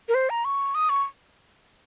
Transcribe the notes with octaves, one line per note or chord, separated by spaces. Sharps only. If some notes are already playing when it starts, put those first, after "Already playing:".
A#4
C5
A#5
C#6
D#6
C#6